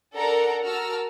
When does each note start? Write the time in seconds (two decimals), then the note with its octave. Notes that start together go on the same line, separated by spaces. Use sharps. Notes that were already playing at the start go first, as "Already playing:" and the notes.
0.15 D4 A4 A#4 F#5 A#5
0.63 F#4 A#4 A5 A#5 E6 F6